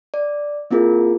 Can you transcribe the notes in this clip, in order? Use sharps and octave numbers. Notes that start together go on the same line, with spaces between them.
D5
A#3 C4 E4 F4 G#4 A#4